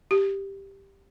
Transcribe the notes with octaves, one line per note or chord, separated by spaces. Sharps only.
G4